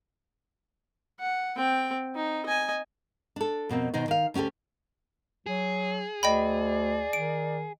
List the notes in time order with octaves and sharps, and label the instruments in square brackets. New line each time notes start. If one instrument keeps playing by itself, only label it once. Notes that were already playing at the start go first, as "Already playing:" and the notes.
[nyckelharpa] F#5
C4 G5
D#4
D#5 G#5
[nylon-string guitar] D4 A4
F2 B2 A#3 C4
B2 D#3 D#4 C5
D#3 F5
D2 C#4 F#4 G4 A4
[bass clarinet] F#3 [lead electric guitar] G#4
[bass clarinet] D2 [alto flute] D5 [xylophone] D#5 G5 B5
[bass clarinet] D#3 [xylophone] D7